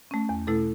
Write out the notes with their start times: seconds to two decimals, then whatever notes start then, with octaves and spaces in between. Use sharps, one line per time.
0.11 A3 C#4
0.29 E2
0.47 B2 A3 E4 A4